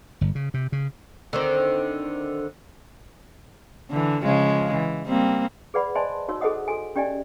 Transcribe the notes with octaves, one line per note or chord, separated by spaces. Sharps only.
G1
C#3
C3
C#3
D3 D#3 C4
D3 E3
C#3 F3 G#3
E3
G3 A#3 C4
G#4 B4 D5 F#5 B5
C5 D5 D#5 G#5 A5 C6
D#4 F#4 C#5 E6
G#4 A4 C5 D#5 F#5 D#6
F#4 A4 G#5
C#4 G4 D5 D#5 G#5